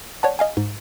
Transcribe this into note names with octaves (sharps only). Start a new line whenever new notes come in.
C#5 D5 F#5 A5
D#5 F5 G#5
G#2